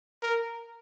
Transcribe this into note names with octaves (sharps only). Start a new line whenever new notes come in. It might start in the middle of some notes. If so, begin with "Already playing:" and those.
A#4